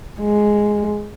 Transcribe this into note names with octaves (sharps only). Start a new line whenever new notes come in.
G#3